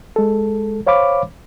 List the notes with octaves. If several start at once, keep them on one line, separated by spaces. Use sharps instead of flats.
G#3 A4
C5 C#5 F5 B5 D6